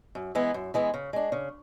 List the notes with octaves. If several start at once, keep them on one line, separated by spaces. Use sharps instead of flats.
F#2
E3 G#3 B3 E4
F#2
E3 G#3 B3 E4
C#3
G#3 D4
C#3